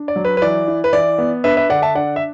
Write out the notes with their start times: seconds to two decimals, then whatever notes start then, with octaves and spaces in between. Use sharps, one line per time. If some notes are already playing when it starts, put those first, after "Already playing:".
Already playing: D4
0.08 D5
0.16 F#3
0.25 B4
0.37 B4
0.42 E3 D5
0.68 E4
0.84 B4
0.93 E3 D5
1.18 B3
1.44 D4 B4 E5
1.57 B4 E5
1.69 D3 D5 F#5
1.82 E5 A5
1.95 D4 D5 F#5
2.16 E5